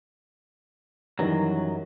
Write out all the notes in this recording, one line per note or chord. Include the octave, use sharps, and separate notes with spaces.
F#2 D#3 E3 F#3 G3